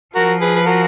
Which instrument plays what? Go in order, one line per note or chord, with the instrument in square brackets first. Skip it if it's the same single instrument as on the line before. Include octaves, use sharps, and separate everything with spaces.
[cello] F3 [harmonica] F#4 A#4
[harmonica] G#4 B4
B4
F#4 A#4